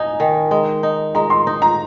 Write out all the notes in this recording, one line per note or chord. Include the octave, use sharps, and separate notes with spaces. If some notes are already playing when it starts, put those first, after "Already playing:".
Already playing: D#4 G#5 A#5
D#3
G#3
D#4
G#3 A#5
C6
D#4
A#5